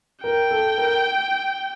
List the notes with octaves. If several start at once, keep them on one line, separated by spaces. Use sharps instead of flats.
A#4 G5
A4
A#4